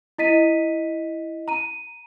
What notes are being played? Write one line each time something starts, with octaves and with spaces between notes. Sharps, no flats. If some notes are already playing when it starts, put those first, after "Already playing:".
E4 D#5 B6 D#7
A#5 D#7